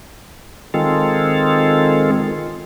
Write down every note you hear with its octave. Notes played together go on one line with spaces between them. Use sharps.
D#3 G#3 C4 F4 A4